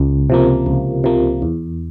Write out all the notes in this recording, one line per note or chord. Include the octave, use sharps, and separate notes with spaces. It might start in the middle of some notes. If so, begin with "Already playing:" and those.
Already playing: C#2
C3 F3 A#3
C#2
C3 F3 A#3
E2